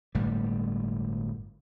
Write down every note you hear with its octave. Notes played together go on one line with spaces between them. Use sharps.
G1 A2 G3